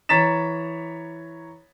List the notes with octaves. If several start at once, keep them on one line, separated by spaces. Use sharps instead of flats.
E3 C#5 A#5 A6 B6 E7